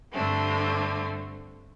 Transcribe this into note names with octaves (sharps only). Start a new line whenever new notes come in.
G2 D3 A3 C4